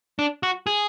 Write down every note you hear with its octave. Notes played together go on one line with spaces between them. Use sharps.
D4
F#4
G#4